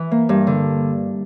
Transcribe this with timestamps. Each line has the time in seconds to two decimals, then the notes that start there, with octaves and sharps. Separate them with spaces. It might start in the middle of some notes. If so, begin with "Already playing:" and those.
Already playing: E3
0.11 A#3
0.29 G2
0.47 D3